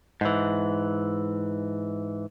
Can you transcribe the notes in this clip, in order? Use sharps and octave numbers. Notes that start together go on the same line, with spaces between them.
G#2 E3